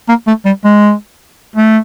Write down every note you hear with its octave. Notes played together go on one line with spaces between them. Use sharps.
A#3
A3
G3
G#3
A3